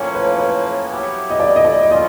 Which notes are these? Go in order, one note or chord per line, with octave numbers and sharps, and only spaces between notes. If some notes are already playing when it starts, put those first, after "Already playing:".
Already playing: A2 F3 A#3 C#4 C#5
B4
B4
F#3 B3 E4 G4
D#5
D5
D#5
D5
A#3 C#4 F4 D#5